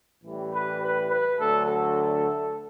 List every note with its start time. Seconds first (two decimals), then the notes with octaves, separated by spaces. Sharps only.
0.24 A1 A2 E3 G3
0.52 B4
0.80 B4
1.09 B4
1.37 D2 D3 F#3 A3 A4
1.66 A4